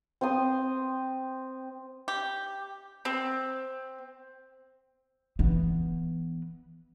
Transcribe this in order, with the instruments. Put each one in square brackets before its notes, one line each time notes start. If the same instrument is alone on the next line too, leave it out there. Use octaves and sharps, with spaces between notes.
[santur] C4 C6 D#6
[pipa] G4
[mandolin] C4
[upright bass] E3 B3